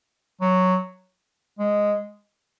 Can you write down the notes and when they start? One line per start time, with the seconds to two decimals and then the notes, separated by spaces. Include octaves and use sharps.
0.41 F#3
1.59 G#3